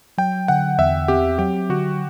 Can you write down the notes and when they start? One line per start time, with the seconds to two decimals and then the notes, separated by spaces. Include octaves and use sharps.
0.18 F#3 G5
0.48 D3 F#5
0.78 E2 E5
1.08 C4 G4
1.39 F#3 G4
1.70 D3 F#4